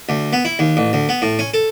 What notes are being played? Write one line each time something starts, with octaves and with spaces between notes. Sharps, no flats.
D2
B3
E4
D#2
A1
D2
B3
A2
C#4
A4